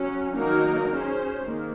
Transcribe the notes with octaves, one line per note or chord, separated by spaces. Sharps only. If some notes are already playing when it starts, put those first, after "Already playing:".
Already playing: F#3 C#4
D#3 F#3 A#3 D#4 A#4
C#4 G#4 C5
D#3 A#3